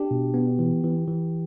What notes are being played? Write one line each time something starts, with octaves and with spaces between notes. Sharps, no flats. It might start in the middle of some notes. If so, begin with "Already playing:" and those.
Already playing: D4 G4
B2
B3
E3
E3
E3